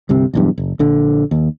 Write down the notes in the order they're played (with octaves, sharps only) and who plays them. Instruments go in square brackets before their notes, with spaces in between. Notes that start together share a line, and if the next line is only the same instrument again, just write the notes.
[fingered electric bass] G1 C2 C3 C4
B1 E2 G2
F#1
A#1 D3
D#2